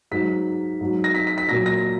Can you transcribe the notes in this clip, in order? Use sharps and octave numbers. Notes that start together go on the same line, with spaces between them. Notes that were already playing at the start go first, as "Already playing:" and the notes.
G#2 F#3 B6
G#2 F#3
A#6
B6
B6
B6
A#2 F#3 A#6
A#6